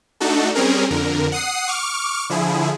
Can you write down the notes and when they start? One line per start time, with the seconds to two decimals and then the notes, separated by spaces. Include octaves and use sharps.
0.20 A3 D4 D#4 F#4 A4
0.55 G3 C4 C#4 G#4 A#4
0.90 F2 D3 A#4
1.32 F#5 D#6 C7
1.68 C#6 D6 F6
2.30 D3 F3 E4 G#4